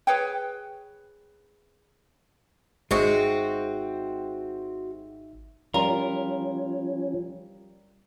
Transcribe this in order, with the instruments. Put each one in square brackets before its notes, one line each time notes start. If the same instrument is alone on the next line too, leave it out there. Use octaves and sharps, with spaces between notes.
[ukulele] G#4 B4 C#5 G5
[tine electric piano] G#1 D#4 E5 [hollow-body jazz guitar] G#3 [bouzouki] C4 F#4
[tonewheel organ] F3 C#4 [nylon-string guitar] G3 F4 [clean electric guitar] A#4